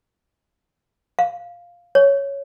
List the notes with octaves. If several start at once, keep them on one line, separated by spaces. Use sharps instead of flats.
F5
C#5